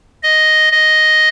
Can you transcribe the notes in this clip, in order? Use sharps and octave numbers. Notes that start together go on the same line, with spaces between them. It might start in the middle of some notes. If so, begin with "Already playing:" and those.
D#5
D#5